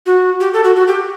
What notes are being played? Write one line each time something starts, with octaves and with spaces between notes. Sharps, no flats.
F#4
G4
A4
F#4
F#4
G4